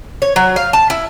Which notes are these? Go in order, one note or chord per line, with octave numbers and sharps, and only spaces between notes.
C#5
F#3
F5
A5
E4